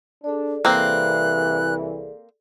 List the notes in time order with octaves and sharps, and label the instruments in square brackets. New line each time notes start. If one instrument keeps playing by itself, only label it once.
[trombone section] D4 [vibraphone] G#4 A4 D5
[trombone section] C2 E3 [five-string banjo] A#3 C4 [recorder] F#6